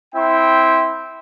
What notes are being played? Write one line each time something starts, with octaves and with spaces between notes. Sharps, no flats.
C4 E4 E5 G5 C6